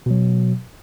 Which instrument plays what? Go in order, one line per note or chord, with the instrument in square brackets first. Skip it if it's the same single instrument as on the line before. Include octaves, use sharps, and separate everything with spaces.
[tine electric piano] B2 F#3